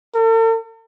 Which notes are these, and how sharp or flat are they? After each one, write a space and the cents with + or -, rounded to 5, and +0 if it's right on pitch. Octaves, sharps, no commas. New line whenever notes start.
A4 +45